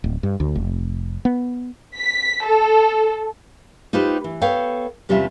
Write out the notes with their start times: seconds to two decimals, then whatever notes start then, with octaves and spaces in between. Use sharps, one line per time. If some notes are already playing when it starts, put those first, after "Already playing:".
0.04 D1
0.23 G2
0.40 D2
0.55 F1
1.25 B3
1.97 B6
2.45 A4
3.93 D#4 F4 G4 B4 C5
4.24 E3
4.41 B3 A4 C#5 F5 G5
5.09 E2 C3 G3 C#4 F4 E5